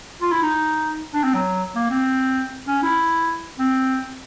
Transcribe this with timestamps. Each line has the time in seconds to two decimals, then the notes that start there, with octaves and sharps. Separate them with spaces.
0.22 F4
0.32 E4
0.42 D#4
1.14 D4
1.24 C4
1.34 F#3
1.75 A#3
1.90 C4
2.67 C#4
2.83 E4
3.59 C4